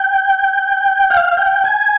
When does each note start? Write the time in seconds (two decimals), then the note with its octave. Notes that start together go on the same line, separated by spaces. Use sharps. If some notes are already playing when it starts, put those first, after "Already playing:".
Already playing: G5
1.10 F5
1.37 G5
1.64 G#5